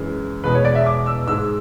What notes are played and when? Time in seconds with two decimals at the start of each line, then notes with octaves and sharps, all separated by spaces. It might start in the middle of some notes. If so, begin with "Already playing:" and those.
Already playing: F#2 E3 G#3
0.44 E2 B2 G#3 B4
0.55 C#5
0.65 D5
0.75 E5
0.86 D6
1.06 E6
1.27 G#2 G#3 E6